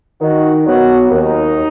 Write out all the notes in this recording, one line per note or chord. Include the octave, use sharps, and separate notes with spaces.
D#3 F#4
F#3 B3 F#4
D#2 D#4